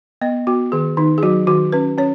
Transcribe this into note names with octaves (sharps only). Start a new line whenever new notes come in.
B3 D#5
B3 F#4
D#3 G#4
D#3 D#4
G#4
F#3 F#4
D#3 F#4
C#4 B4
C#4 C#5